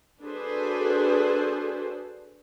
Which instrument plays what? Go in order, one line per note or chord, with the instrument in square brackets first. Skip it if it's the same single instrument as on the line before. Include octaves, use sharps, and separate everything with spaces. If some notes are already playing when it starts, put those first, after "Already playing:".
[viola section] D4 F#4 G#4 A4 B4 C5